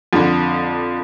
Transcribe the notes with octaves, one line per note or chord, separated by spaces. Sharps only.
F2 D3